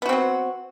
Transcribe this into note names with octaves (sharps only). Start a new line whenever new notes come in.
F#3 B3 C4 F#4